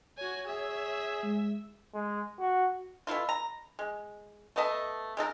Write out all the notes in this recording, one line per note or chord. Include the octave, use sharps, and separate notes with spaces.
F#4 C#5 G#5
G#4 E5
G#3
G#3
F#4
B2 A3 E4 F4
A#5
G#3
A3 B3 D#5 A5
G#3 D#4 A4 A#4